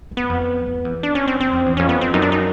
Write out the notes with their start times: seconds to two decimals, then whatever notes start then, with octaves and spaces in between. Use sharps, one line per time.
0.11 F#2
0.17 B3
0.30 F2
0.66 F2
0.85 E2
1.03 D4
1.15 C#4
1.28 C4
1.40 F#2 C4
1.53 F2
1.66 E2
1.77 F2 C#4
1.89 B3
2.01 C4
2.14 F#2 D#4
2.22 D4
2.32 D#4